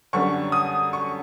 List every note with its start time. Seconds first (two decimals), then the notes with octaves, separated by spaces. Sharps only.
0.13 F#2 D3 G3 B3 C#6
0.52 D#6
0.93 C#6